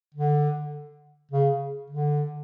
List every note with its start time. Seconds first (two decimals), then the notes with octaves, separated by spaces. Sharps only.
0.15 D3
1.31 C#3
1.90 D3